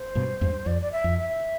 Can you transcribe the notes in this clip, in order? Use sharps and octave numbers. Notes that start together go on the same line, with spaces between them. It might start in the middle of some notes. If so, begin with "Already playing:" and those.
Already playing: C5
G2 B2
E2 G2
F2 D5
D5
E5
F2
E5